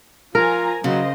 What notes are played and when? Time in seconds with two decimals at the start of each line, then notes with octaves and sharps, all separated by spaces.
0.35 F3 F4 A#4 G#5 A#5
0.84 C#3 F#3 C5 D#5